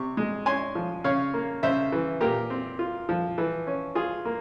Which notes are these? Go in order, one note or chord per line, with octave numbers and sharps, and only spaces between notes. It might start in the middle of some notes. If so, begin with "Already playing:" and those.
Already playing: C3 C#6
G#3
C#4 G#5 C6
F3
C#3 C#5 F5
A#3
C#3 C5 E5
E3
A#2 G4 A#4
C4
F4
F3
E3
C#4
F4 G#4
A#3